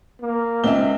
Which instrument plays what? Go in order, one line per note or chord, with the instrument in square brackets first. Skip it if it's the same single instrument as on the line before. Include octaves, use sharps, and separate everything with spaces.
[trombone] A#3
[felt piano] C#2 E5 [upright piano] C4 D#4 G7